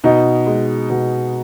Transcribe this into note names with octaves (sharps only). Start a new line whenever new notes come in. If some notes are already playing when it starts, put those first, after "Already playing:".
B2 D#4
G#3
B2